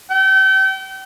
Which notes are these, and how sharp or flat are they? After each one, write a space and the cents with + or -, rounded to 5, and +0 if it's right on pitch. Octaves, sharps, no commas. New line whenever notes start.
G5 -35